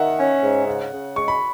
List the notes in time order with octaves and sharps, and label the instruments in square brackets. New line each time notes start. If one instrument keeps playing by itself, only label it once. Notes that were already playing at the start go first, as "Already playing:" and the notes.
Already playing: [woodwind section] D#3 [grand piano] E5 F#5
[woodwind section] C#4
G#2
C#3
C#3
[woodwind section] G#3 [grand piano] C#6
[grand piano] B5